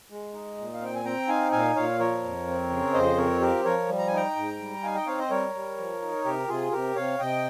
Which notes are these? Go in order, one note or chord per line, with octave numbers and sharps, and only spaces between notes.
G#3
D#4
A#2
F5
C4 G5
G#5
C4 G5 A#5
D#4 F5 G#5
A#2 F5 G#5
A#2 C#5 F5
F3 A#4 C#5
F2
C4
C#3
F2 C5 D#5
C4 A#4 C#5
F3 G4 A#4
F3 A#4 C#5
G3
A#5
G#5
D#4 G5 A#5
G#2
G3
D#4 F5 G#5
D#5 G5
C4 C#5 F5
C5 D#5
G3 A#4 C#5
G3
F3
D#4
C3 G4 A#4
C3 F4 G#4
C3 G4 A#4
C3 C#5 F5
C3 D#5 G5